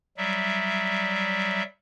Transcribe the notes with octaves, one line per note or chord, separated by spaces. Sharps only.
F#3 G3 E5